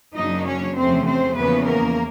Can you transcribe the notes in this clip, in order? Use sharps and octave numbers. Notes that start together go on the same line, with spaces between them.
F#2 C#3 F#3 A#3 D4 D#4 D#5
C#4 C#5
E2 C3 F3 A3 C4 C#4 C5
C4 C5
E2 C#3 F3 A#3 B3 C#4 B4
A#3 A#4